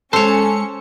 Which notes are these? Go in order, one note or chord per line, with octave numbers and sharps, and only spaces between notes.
G#3 C#4 A4 C5 C#5 A5 C#7